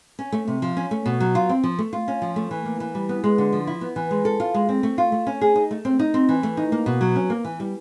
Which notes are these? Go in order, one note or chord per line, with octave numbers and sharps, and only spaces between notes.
C#4
A3
C3
F3
C#4
A3
B2
F#3
F4
C4
F3
A3
F4
C#4
F3
A3
E3
A#3
E3
G3
B3
G#3
D3
F3
E4
B3
E3
G#3
A4
F4
G#3
C4
A3
F4
A3
C#4
G#4
D#4
A3
C4
D#4
C4
E3
A3
D#4
A#3
B2
F#3
C#4
A#3
E3
G3